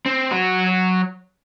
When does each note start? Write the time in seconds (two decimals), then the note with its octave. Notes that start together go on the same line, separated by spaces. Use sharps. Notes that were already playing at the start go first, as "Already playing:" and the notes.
0.06 C4
0.32 F#3 F#4